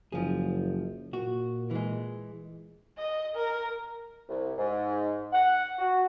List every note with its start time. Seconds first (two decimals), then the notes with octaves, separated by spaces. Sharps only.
0.12 F#1 F3 G#4
1.13 A#2 F#4
1.71 E3 G#3
2.98 D#5
3.36 A#4
4.29 C2
4.58 G#2
5.33 F#5
5.79 F#4